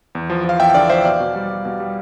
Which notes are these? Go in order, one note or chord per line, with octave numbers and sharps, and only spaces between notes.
E2
F3
F3 F5
E2 E5 G5
G5
D3 D5 F5
F3 C5 E5
B2 D5 F5
B2
G3
G3
B2
G3